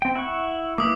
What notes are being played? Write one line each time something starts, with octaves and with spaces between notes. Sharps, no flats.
C4 G5
E4 F#5 C#6
A#3 E4 B4 D6 D#6